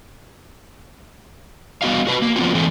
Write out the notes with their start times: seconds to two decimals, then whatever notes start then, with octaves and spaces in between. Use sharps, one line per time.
1.82 G3 B3 C4 F#4 D#5 F5
2.07 F#4 B4
2.22 A#3
2.36 F3 B3 C4 F4 F#4
2.55 E3 F3 A3 C4